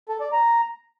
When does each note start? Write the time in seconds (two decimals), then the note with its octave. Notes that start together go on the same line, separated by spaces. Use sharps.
0.09 A4
0.20 D5
0.32 A#5